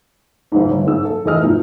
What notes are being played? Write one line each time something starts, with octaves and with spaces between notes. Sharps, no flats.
F#1 C#2 G#2
G1 C#5
F#1 G#2 A#3 E6
A4
F1 E3 A3 D#5 F6
B2 F3 D#4